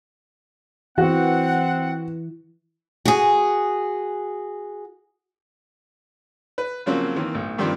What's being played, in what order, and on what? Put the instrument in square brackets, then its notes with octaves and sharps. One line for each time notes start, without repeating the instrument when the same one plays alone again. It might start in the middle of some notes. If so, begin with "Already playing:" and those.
[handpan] E3 [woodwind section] C4 F#5 [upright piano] F#4
[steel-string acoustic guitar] F#4 G#4
[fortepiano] B4
C#3 F3 F#3 A#3 C4 C#4
D#3 E3 A#3 C4
B1 A2
G2 D#3 F3 G3 C4